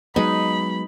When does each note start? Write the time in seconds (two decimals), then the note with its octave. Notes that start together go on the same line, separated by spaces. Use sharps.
0.16 F#3 G#3 B3 D#4 B5